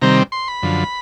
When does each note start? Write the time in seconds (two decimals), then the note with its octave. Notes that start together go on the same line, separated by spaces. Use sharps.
0.02 C3 D#3 G3 C4 A#5
0.32 C6
0.48 B5
0.62 F#2 D3 F3